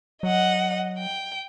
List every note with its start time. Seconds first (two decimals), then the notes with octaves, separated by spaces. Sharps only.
0.23 F#3 D#5 F#5
0.98 G5